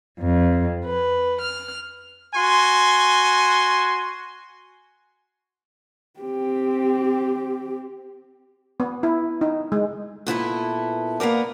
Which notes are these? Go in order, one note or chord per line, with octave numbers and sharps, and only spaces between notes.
F2
B4
F6
F#4 G#5 C6
C4 G4
B3
E4
D#4
G#3
A#2 B3 E4 A4
A#3 B3 A#4 D5